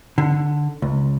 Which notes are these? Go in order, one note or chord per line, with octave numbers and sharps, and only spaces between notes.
D3
C#2